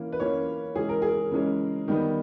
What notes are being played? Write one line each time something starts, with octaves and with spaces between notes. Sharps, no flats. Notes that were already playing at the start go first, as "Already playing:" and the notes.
Already playing: E3 A#3 C#4
B4
E3 A#3 C#4 C#5
C#3 E3 G#3 C#4 G#4
A#4
G#4
C#3 E3 G#3 C#4
D#3 G3 B3